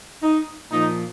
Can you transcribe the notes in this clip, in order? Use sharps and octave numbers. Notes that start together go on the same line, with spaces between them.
D#4
A#2 F3 D#4